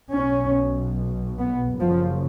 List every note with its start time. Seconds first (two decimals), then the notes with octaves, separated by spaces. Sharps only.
0.13 B1 B2 C#4
1.38 B3
1.80 F#1 F#2 C#3 F3